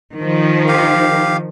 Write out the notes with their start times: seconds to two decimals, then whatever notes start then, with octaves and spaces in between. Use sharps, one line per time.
0.16 D#3 F3
0.68 G4 F5